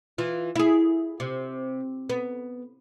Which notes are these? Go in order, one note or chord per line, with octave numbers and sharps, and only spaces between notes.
E3 F4
E4 G#4
C3
B3